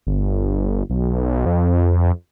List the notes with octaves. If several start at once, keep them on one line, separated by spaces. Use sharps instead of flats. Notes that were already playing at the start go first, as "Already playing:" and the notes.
G1
B1
F2